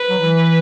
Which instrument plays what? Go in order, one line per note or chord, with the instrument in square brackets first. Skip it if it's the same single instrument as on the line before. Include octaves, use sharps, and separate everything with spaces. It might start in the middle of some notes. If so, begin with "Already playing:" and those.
Already playing: [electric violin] B4
[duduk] F#3
E3